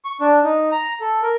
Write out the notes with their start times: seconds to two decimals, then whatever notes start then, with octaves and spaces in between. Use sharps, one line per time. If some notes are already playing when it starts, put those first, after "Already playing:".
0.05 C#6
0.21 D4
0.44 D#4
0.72 A#5
1.01 A4
1.23 A#4